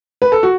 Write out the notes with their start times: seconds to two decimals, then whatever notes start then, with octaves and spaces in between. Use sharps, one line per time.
0.22 B4
0.32 A4
0.43 F#4